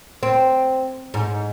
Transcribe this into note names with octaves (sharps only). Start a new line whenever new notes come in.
C4
G#2